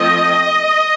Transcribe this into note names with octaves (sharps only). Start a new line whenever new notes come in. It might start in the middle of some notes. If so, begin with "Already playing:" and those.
Already playing: F3 A3 C4 D#5